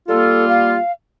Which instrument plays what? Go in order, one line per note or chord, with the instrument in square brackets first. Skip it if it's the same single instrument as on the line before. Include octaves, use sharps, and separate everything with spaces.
[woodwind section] G3 A#3 F4 [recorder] A4
[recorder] F5